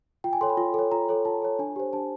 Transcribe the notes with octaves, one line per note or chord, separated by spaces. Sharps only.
F4 G5
G#5
A4 C#5 C6
B5
F4
A4 C#5
F4 A#5
A4 C#5
F4 A5
A4 C#5
D4 G#5
G4 C5
D4 A5